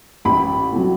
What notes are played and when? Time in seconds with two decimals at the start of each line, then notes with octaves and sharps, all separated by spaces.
0.25 A1 B5
0.72 A2 F#3